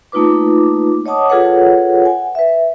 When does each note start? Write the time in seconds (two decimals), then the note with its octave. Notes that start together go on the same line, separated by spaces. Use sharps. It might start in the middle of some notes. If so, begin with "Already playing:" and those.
0.12 A3 A#3 D#4 F4 B4 D6
1.06 C#5 D#5 F#5 A5 D6 D#6
1.30 F4 G#4 A4 B4 C#5 F#5
2.04 F#5 G#5
2.35 B4 E5